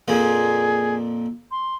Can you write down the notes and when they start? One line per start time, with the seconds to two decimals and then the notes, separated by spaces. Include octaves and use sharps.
0.08 F2 A#2 F3 G#4
1.51 C6